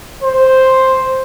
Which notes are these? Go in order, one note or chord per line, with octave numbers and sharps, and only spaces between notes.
C5